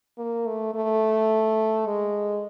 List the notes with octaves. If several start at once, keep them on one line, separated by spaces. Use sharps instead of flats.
A#3
A3
A3
G#3